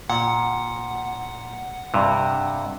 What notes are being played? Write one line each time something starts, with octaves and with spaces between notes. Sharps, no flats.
A#2 F#5
G2 C3